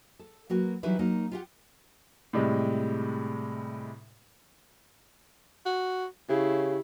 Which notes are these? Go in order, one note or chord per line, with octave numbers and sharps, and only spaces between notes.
A4
F#3 A#3 F#4 B4
E3 F#3 G3 D#4 E4 B4
F#3 A#3 D#4 F#4
F4 G4 F#5
A2 C3 G3 G#3
F#4
C#3 E4 G4